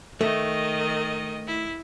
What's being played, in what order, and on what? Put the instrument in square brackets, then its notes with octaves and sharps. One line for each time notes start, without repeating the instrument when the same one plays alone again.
[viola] D#3 D#5 [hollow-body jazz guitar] A3
[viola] E4